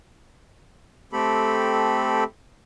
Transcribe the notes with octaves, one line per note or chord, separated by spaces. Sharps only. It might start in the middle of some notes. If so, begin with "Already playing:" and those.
A3 C4 G4 A4 B5